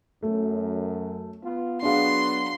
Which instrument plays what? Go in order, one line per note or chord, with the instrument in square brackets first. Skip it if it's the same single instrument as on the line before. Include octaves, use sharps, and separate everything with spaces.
[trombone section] F#2 [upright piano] A3
[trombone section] B3 F4
[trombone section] F#3 B3 F#4 [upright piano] D4 G#4 F5 [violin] C6